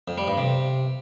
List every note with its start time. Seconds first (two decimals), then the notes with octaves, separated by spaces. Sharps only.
0.08 F2
0.18 G3
0.28 G2
0.38 C3